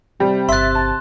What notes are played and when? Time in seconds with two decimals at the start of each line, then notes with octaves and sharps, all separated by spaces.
0.20 C3 G3 G5
0.49 G1 E5 C6 F#6 A6
0.75 A5